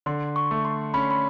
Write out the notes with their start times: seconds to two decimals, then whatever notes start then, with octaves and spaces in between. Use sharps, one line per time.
0.06 D3 C6
0.36 C#6
0.51 A3
0.65 C6
0.94 C#4 B5
1.02 C6
1.11 B5